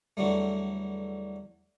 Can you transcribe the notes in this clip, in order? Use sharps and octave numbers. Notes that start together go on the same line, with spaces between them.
E2 D3 F#3 G3 A3